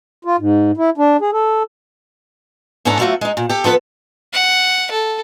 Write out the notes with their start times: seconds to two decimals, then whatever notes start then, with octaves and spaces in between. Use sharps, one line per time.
0.25 F4
0.39 G#2
0.77 E4
0.98 D4
1.21 G#4
1.32 A4
2.85 E2 G#2 C#4 D4 A4 A#5
2.99 F#3 A3 F4 F#4 E5
3.21 G#3 D#4
3.37 A#2
3.49 G4 A4
3.64 F3 B3 A4 B4
4.33 F#5
4.90 A4